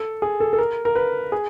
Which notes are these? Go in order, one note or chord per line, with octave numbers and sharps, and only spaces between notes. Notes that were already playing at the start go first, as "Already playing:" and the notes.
Already playing: A4
G#4
A4
A4
A#4
A#4
B4
G#4